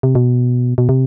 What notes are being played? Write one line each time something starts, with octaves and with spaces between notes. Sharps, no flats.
C3
B2
B2
C3